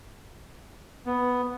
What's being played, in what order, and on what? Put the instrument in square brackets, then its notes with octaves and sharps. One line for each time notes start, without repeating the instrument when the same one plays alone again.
[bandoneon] B3